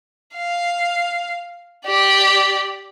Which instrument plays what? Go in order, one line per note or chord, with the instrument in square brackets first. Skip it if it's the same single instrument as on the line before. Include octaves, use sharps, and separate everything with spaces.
[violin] F5
G4 D5